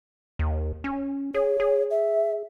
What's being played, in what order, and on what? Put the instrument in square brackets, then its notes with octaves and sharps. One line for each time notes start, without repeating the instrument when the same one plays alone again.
[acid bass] D#2
C#4
[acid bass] G#4 [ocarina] C#5
[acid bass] G#4
[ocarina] E5